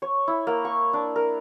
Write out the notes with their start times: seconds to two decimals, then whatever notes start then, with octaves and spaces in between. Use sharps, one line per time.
0.02 C#5
0.27 E4
0.47 A#3
0.65 C#6
0.93 D4
1.16 A#4